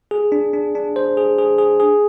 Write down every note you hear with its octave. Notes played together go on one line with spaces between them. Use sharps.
G#4
D4
D4
D4
C5
G#4
G#4
G#4
G#4